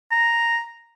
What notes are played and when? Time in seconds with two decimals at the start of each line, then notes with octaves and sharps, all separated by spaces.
0.11 A#5